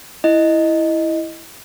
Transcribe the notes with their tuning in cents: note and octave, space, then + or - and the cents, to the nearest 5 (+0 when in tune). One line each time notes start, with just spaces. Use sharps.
E4 +0 D#5 +0